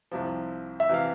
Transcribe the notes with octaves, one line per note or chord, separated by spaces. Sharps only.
C2 C3 F3
E5
C3 E3 F5